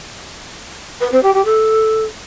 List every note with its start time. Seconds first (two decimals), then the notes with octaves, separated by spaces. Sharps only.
1.00 B4
1.11 C4
1.23 G4
1.34 G4
1.45 A4